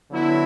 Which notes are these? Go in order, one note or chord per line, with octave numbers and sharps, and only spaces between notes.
D3 F#3 B3 E4